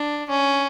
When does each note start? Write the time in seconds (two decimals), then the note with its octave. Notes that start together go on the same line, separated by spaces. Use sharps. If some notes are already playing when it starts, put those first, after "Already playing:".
Already playing: D4
0.30 C#4